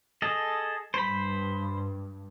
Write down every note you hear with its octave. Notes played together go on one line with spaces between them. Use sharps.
G#4 A4 D#5
G2 C5 B5